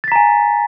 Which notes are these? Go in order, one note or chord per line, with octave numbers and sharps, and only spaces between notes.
G#5 A#5 A6 B6